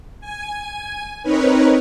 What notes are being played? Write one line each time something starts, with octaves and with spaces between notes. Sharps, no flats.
G#5
C4 D#4 A#4 B4 C#5